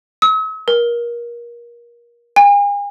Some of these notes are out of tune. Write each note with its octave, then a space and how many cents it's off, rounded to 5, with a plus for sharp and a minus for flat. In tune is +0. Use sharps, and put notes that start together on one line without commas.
E6 -45
A#4 +25
G#5 -40